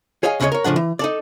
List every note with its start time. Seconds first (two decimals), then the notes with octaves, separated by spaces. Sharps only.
0.23 G#4 C#5 D#5 F5 G#5
0.40 D2 C#3 E4 F4 C#5 D#5
0.52 A#4 C#5
0.64 A2 C#3 F3 D4 F#5
0.76 E3
0.99 D#4 A4 D5